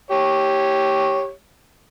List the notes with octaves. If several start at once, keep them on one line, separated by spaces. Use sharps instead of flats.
G4 C#5